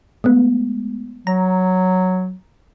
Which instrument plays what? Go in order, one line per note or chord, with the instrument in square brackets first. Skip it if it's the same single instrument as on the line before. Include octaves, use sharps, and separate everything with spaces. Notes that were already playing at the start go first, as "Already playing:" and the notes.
[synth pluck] G#3 A3 B3
[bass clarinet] F#3 [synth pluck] A#5